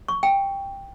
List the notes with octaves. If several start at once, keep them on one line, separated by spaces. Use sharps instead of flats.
C#6
G5